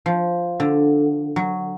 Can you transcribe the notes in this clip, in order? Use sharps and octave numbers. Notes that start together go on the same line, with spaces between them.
F3
D3
F#3